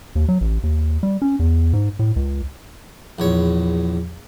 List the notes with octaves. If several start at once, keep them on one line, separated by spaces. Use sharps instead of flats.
D#2
F#3
A1
D#2
G3
C#4
E2
G#2
A2
C#2
A#1 E2 C#5